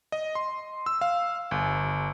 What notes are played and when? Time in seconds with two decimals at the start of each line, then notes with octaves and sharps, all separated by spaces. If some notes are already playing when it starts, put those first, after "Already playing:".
0.12 D#5
0.35 C6
0.86 E6
1.01 F5
1.51 G1